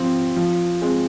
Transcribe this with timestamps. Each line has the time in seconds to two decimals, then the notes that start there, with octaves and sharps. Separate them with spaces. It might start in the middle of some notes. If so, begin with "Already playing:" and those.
Already playing: F3 C4
0.36 F3
0.82 G#3 C4